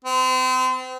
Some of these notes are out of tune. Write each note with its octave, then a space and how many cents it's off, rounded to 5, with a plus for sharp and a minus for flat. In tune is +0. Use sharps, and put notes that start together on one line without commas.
C4 -35